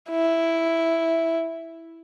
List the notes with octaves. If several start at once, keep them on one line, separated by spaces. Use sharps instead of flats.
E4